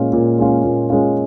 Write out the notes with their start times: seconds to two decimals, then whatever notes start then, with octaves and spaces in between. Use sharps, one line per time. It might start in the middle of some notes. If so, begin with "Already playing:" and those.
Already playing: A#2 G#3 C#4 F4
0.13 A#2
0.39 G#3 C#4 F4
0.64 A#2
0.90 G#3 C#4 F4